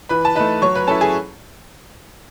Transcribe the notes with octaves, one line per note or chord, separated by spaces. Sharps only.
E3 B4 B5
A5
A3 D#4 B4 B5
F#3 C#5 C#6
B4 B5
C#4 E4 A4 A5
G#4 G#5